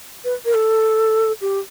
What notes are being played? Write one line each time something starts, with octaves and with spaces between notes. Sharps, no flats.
B4
A#4
A4
G4